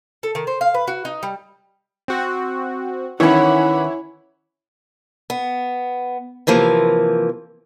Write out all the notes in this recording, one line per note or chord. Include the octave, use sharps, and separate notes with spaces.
A4
D#3
C5
F5
B4
F#4
D#4
G3
C4 F#4
D#3 E3 C#4 E4 C#5 F#5 B5
B3
C3 E3 F3 A#3